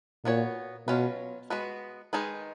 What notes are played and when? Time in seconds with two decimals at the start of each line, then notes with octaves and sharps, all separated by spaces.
0.25 A#2 B3 F#4 C#5
0.88 B2 F#3 C#4 F4 B4
1.50 G#3 B3 F#4 B4
2.13 D#3 G#3 D#4 G#4 B4